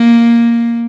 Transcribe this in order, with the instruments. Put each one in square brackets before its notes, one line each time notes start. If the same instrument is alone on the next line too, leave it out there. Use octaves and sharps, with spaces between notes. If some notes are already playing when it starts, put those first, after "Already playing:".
Already playing: [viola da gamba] A#3